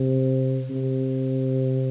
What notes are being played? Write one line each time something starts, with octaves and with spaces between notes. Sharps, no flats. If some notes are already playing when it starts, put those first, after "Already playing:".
Already playing: C3
C3